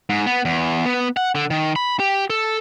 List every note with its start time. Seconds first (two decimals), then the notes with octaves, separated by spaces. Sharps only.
0.10 G#2
0.26 B3
0.45 E2
0.86 B3
1.17 F#5
1.35 D3
1.50 D#3
1.76 B5
2.00 G4
2.30 A4